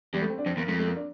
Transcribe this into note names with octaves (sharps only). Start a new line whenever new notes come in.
E2 G3
A3
C4
D4
F2 C4
E2 A#3
F2 A3
A3
A#3
D4